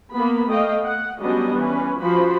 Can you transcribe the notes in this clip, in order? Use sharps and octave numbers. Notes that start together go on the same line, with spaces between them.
A#3 B3 B5
A3 D#5 F5 G5
F#5
F#3 G3 B3 C#4 D4 D#5
E3 C#4 B4
F3 F#4 C5 B5